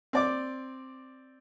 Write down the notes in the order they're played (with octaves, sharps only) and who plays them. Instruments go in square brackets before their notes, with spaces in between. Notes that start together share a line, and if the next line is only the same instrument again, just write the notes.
[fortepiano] C4 D5 D6